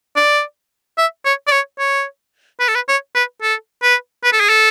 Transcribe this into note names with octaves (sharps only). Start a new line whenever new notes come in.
D5
E5
C#5
D5
C#5
C#5
B4
A4
B4
C#5
B4
A4
B4
B4
A4
G#4
A4